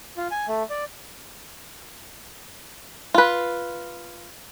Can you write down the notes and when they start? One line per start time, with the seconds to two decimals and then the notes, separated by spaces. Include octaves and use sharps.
0.17 F4
0.31 G#5
0.47 A3
0.70 D5
3.14 F4 B4